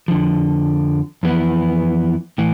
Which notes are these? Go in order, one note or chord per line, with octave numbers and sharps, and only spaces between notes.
F2 D3 F3
F2 E3 B3 E4
A2 E3